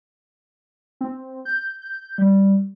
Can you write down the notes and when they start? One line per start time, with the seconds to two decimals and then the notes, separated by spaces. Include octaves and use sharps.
1.01 C4
1.45 G6
1.82 G6
2.18 G3